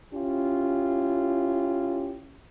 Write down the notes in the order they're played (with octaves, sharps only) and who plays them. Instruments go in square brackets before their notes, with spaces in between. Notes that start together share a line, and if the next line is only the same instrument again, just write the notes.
[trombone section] C#4 E4 F4 G4